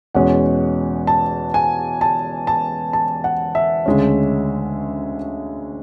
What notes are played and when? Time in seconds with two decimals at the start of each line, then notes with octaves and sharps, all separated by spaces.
0.15 E2 B2 G#3 C#4 F#5
1.07 A5
1.54 G#5
2.01 A5
2.47 A5
2.93 A5
3.24 F#5
3.55 E5
3.86 D2 C#3 G#3 C#4